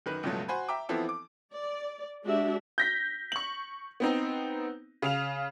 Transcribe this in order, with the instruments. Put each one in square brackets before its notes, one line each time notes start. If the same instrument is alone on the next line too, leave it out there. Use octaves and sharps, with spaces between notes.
[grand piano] F#2 D#3 B4
C#2 G2 B2 F3 F#3 A3
F#4 C5 G#5 B5
E5 G5 A#5 D6
E3 F3 B3 C4 E4 A4
D6
[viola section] D5
G#3 D4 F#4 G4 E5
[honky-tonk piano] G6 A#6 B6
C#6 F#7
B3 C4 D#4
C#3 F5 F7